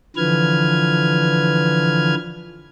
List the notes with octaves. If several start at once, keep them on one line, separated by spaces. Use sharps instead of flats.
D3 E3 F3 B4 F6 G#6